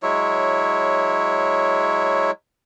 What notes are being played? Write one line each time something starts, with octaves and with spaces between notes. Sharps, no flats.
F#3 G#3 E4 C#5